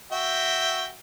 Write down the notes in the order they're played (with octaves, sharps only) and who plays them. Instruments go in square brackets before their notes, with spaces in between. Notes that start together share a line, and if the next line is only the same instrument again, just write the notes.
[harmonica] F#4 E5 G5